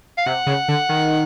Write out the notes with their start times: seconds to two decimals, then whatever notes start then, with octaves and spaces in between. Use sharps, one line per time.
0.18 F5
0.26 C3 F#5
0.47 C#3
0.68 D3
0.89 D#3